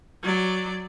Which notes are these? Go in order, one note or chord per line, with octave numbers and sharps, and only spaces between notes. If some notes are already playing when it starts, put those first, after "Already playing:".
F#3 D5